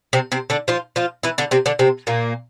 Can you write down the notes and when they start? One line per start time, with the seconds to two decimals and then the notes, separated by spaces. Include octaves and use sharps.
0.13 C3 C4
0.32 C3 C4
0.50 D3 D4
0.68 F3 F4
0.96 F3 F4
1.23 E3 E4
1.38 D3 D4
1.51 C3 C4
1.66 D3 D4
1.79 C3 C4
2.07 A#2 A#3